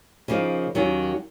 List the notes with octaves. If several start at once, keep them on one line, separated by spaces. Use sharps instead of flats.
C#3 F3 A#3 D#4
D#2 D#3 F#3 C#4